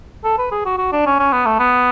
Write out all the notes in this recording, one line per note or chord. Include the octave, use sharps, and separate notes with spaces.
A4
B4
G#4
F#4
F#4
D4
C#4
C#4
B3
A3
B3